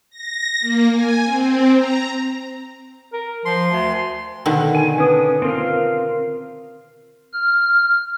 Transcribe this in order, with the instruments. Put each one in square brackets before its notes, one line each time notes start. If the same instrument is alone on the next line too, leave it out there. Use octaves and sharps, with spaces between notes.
[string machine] A#6
A#3
G#5
C4
A#5
[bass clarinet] A#4
[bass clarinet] F3 [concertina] C6
[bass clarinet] D2
[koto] B2 D3 D#3
[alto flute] D#4 [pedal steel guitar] G#5
[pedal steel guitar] C#4 D4 D#6 [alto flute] B4
[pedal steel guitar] C4 F4 F5 [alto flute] A#4
[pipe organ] F6